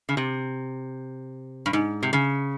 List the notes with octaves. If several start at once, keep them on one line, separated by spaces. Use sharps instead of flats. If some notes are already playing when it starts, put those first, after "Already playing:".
C#3
C3
G2
G#2
C3
C#3